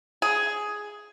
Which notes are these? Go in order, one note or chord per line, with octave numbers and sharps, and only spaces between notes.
G#4